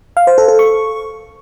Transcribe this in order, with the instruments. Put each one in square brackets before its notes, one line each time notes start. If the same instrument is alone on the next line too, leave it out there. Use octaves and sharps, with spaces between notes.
[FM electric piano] F5
C5
A4
A4
C#6